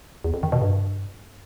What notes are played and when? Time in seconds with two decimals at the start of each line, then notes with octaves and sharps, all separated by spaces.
0.24 E2
0.34 F2
0.43 D#3
0.52 B2
0.62 G2